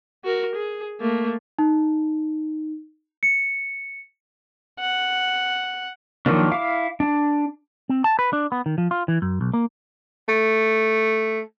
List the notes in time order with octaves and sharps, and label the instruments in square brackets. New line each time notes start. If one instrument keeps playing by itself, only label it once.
[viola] F#4 A#4
G#4
A3 A#3
[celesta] D#4
C#7
[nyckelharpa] F#5
[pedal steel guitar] D#3 F3 F#3 A#3 D4
E4 F5 D6
D4
[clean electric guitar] C4
A5
B4
D4
B3
D#3
F3
F4
E3
F#2
B1
A#3
[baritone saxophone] A3